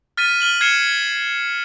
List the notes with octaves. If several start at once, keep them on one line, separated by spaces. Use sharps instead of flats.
F6 A6 B6 D#7
F6 F#7 G7
F6 G#6 C7 C#7 E7